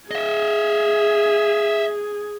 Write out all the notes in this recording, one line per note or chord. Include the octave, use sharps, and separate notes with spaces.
G#4 D#5 E5